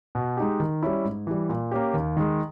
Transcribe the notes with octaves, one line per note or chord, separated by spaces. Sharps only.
B2
G#3 D#4 G4
D#3
G3 C#4 E4
G#2
E3 G3
A#2
A#3 C#4 G4
D#2
D#3 G#3